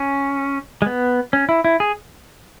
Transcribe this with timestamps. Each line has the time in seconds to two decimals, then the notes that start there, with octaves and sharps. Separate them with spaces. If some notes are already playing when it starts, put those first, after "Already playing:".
Already playing: C#4
0.82 G#3
0.86 B3
1.33 C#4
1.49 E4
1.65 E4
1.80 G#4